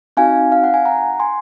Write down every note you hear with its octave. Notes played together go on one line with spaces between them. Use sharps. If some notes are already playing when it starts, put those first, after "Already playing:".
C4 D#4 F#4 F5 G#5
F5
F#5
G#5
F#5 A#5
G#5 C6